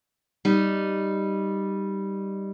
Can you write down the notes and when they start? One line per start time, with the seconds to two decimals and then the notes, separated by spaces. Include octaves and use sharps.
0.45 G3 D#4